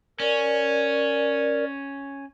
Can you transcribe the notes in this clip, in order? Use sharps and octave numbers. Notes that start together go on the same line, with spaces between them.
C#4 A#4 D5